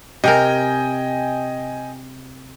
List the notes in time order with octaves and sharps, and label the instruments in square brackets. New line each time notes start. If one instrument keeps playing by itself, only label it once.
[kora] C3 A#4 [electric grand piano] D#5 G5 G#5